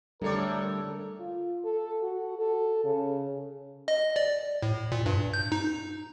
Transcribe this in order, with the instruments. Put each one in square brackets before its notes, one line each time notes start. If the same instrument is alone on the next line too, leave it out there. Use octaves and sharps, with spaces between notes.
[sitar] A2 C#5 D5 [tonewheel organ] D3 A3 [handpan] G3 A4 [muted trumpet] A#4
[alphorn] F4
A4
F#4
A4
C#3
[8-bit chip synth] D#5
D5
A2
A#2
G2
G6
D#4